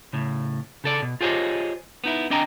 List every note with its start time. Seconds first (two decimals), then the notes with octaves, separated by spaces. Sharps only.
0.13 A2 C#3
0.84 C#3 A4 D5
1.02 B2
1.21 F4 G4 G#4 C5 C#5 D#5
2.04 B3 D#4 E4
2.30 C4 D4 D#5 G5 G#5 A#5